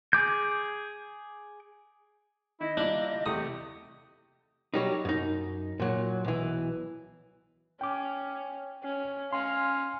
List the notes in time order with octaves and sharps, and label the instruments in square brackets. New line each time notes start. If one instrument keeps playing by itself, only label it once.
[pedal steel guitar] G#4 D6 G6
[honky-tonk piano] D#3 [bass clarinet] E4 [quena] D#5
[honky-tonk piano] G3 E4 F4 [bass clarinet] A#3 [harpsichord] D4
[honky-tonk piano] E2 C3 A3 [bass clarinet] G4 [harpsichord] D#6
[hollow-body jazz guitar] F#3 G3 D#4
F#2 D#4
A#2 F#3
B1 E3
[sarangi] C#4 [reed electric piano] G5 D6
[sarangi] C#4
[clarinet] C#4 [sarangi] F5 [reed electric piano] G#5 C6